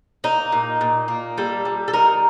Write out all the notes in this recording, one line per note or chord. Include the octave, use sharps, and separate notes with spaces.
A#3 D#4
A#2
A#2
A#3
G3 A4
G3
A4
D#4 A#4